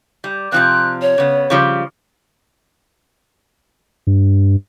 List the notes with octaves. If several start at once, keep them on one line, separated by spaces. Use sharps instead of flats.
G3
C3 F3 C4 F#6
C#5
C#3 B3
C#3 F3 G3
G2